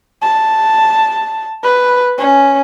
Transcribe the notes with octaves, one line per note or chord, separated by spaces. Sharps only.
A5
B4
C#4